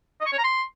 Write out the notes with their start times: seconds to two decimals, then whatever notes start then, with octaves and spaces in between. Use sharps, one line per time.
0.21 D#5
0.26 C#6
0.32 C#5
0.38 A#5
0.44 C6